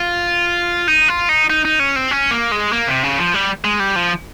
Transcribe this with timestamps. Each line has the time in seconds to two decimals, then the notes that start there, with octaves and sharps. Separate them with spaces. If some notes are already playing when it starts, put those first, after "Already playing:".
Already playing: F4
0.88 D#4
1.08 F4
1.29 D#4
1.50 D#4
1.65 D#4
1.80 C#4
1.96 C4
2.11 C#4
2.31 A#3
2.52 G#3
2.72 A#3
2.87 C3
3.03 C#3
3.18 F3
3.34 G3
3.64 G#3
3.80 G3
3.96 F3